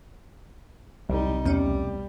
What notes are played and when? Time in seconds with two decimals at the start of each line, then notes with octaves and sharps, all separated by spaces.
1.09 E1 C2 C3 F#3 G3 D#4
1.46 B1 E2 G3 A3 B3 C#4